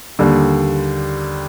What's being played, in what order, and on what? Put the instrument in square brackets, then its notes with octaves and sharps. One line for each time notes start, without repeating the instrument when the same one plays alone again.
[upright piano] D#2 D3 G3